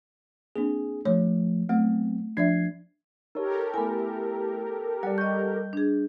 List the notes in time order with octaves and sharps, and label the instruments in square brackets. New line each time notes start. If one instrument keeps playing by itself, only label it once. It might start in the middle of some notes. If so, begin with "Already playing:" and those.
[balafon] A#3 C4 D4 [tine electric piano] G#4
[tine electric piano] F3 A3 [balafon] C#5
[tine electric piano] F#3 B3 C4 [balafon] A3
[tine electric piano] F3 G#6 C7 [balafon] D4 D5 E5
[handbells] D#4 C#5 [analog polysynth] G4 A4 A#4
[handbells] A3 E4 [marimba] B3 G#5
[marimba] G3 [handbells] D5 F#5
[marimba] D#5 C#6 [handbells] G6
[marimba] D4 G#4